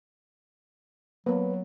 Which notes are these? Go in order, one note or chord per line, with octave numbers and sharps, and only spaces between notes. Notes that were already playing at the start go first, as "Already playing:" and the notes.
F#3 A#3 B3 B4